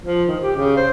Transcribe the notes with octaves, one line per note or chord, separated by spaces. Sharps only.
F3
D#3
G4
C#3
C5